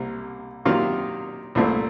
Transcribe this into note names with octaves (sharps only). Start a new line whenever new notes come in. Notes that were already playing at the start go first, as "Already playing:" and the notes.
Already playing: C2 C3 A#3
C3 D#3 F#3 A#3 F4
C2 A#2 A3 C4